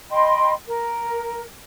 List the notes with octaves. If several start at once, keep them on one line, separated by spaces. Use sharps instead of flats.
D#5 G5 B5 C6
A#4